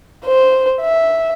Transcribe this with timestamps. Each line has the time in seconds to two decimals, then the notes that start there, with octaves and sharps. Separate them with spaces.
0.25 C5
0.81 E5